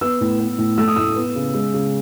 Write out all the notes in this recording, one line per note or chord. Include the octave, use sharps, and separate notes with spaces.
B3 E6
A2
B3
A2
A3 E6
D#6
A2 E6
B3
C#3
G#3
C#3